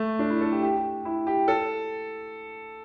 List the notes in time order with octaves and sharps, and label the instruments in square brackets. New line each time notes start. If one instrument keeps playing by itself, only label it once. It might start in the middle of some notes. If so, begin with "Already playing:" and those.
Already playing: [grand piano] A3
D4
E4
A4
G4
G4
G4
E4
G4
A4